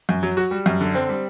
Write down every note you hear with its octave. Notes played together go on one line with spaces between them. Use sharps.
F#2
F#3
F#4
G3
F#2
D3
C4
G3